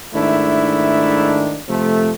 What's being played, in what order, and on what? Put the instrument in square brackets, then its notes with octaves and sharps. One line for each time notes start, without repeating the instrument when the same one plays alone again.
[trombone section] G#2 D#3 A3 D4 E4
C3 F3 A3